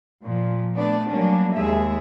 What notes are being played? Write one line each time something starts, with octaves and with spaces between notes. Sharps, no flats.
A#2 F3
A3 B3 D4 D5
F#3 G3 A#3 C#4 D4
D#2 G#3 G#4 E5